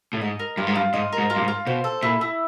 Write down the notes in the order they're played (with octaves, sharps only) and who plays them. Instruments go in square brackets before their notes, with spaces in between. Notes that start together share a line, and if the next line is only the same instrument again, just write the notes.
[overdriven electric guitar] A2
[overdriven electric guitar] G#2 [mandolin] D#5
[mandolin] A#4
[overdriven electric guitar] G2 [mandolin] F4
[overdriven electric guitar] G#2
[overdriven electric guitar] G2 [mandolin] F4
[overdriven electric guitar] G#2 [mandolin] D#5
[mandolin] A#4
[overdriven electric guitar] G#2
[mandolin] F4
[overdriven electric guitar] G2
G#2
[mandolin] F4
[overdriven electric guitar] B2 [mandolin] C5
[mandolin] A4
[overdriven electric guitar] A#2 [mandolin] E4
[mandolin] E4